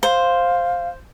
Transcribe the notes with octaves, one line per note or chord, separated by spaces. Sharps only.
C5 F5